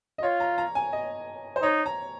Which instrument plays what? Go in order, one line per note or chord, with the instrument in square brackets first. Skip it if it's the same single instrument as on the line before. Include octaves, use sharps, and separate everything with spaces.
[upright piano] D#5
[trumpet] F4 [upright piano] C#5
[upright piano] A#5
A#5
G#5
D#5
C5
[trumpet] D#4 [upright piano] C#5
[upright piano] A#5